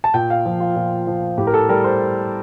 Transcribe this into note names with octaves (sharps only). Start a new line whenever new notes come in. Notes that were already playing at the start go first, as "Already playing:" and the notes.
A5
A#2 G5
F5
F3
F4
A#2
F3
A2 G4
A#4
A4
G3 A#4
C5